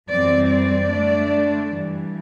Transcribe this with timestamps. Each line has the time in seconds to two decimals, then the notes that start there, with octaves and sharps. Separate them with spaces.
0.11 F#2 E3 G3 C4 D5
0.51 D5
0.91 D3 A3 D4
1.71 G2 E3 G3